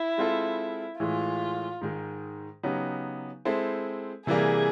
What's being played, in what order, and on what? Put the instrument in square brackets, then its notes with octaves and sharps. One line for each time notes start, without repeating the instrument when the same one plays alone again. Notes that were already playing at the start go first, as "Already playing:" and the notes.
Already playing: [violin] E4
[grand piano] G#3 C4 F4 A4
[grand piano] A2 E3 G#3 [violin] F4
[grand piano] G#2 D#3 G#3
C#3 F#3 B3 D#4 G4
G#3 C4 E4 A4 C5
[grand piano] C3 E3 G3 A#3 [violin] G#4